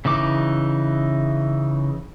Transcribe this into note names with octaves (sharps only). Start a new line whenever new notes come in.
C#3 E3 D#4 D6